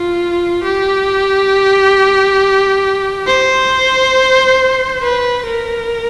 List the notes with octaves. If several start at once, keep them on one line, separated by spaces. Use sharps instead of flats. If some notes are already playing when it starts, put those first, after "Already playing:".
Already playing: F4
G4
C5
B4
A#4